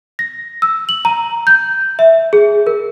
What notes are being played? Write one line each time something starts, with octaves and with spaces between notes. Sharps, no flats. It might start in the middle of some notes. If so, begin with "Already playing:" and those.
A#6
E6
F#7
A#5
G6
E5
G#4
A#4